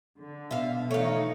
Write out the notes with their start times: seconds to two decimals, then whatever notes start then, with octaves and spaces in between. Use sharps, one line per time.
0.20 D3
0.51 B2 E5 F5
0.91 E3 F3 A3 D#4 C#5 F5